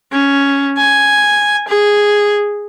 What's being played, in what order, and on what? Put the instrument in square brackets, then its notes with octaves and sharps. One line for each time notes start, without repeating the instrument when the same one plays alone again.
[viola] C#4
G#5
G#4